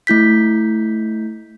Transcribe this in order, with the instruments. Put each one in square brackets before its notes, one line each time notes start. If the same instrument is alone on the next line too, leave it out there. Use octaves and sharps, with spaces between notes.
[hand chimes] A3 E4 G6 B6